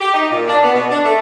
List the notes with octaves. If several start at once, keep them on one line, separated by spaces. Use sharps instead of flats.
G4
D#4
A#2
D4
B3
B2
D4
A3